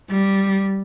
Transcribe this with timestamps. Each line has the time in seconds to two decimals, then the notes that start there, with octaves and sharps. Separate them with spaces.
0.11 G3